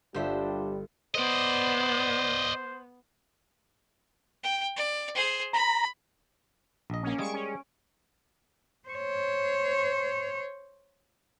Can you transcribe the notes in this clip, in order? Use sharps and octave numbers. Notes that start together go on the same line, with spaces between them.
G1 G3 D4 F4 G4 C5 E5
B3 C5 D5 D#5
G5
D5
G#4 C5
A#5 B5
A#1 D#5
A#3 C#4
G3 G#3 G#4 C#6 D7
C#4
C5 C#5